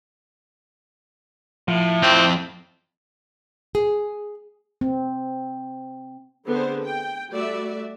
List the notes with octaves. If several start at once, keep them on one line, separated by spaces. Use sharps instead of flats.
A2 F3
F2 C4
G#4
C4
D3 B3 C4 G#4 C5
G5
G3 A3 F#4 D5 E5